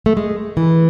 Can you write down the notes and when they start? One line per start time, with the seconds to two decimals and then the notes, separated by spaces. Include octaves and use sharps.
0.06 A3
0.17 G#3
0.57 E3